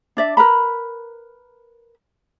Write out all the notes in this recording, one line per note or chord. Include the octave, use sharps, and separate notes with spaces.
D4 D5 E5
A#4 B4 A#5 B5